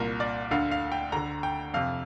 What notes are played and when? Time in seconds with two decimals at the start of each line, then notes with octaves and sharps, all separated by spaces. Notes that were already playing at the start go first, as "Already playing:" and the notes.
Already playing: C2 A#2 A#4
0.20 D5
0.51 D2 D3 F5
0.71 F5
0.92 G5
1.12 D2 D3 A#5
1.43 G5
1.74 F2 C3 F5